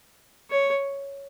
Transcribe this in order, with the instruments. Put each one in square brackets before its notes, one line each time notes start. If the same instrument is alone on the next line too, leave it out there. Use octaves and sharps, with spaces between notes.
[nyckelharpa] C#5